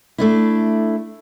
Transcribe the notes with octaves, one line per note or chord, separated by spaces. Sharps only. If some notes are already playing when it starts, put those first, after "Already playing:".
A3 D4 E4